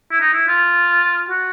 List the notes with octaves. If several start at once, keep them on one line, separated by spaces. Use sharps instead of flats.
E4
D#4
E4
F4
F#4